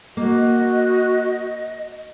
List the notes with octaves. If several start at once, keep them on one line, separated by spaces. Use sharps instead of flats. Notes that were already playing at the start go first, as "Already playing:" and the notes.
A#3 F#4 D#5